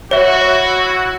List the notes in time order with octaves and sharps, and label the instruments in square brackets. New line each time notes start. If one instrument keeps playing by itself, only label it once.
[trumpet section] E4 F#4 [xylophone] C#5 E5
[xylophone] C#5